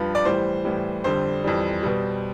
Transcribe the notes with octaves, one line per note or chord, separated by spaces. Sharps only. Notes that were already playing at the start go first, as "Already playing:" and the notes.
Already playing: G2 F3 B4
D5
A2 E3 G3 C5
A2 E3 G3
F2 D3 G3 C5
F2 E3 G3
B2 G3